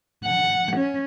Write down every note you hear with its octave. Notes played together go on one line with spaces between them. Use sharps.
F#5
C#4